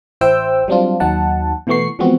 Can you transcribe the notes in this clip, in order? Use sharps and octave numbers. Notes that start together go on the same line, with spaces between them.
A1 E4 C5 G5 E6
F#3 G3 C4 D4 F4
D#2 F#3 D#4 F#5 A5
B2 E3 A3 B3 C#6 C7
E3 F3 G#3 B3 C4 F#4